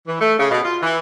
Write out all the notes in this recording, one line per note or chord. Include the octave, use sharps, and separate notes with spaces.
E3
A3
C#3
B2
F4
E3